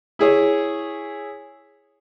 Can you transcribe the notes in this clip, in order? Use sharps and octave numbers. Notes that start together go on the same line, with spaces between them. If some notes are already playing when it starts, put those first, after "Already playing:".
E4 G#4 C#5